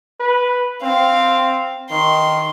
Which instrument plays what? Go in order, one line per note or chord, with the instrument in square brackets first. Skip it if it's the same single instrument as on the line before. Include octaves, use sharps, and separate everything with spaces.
[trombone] B4
[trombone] C4 [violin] F5
[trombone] D#3 [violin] C6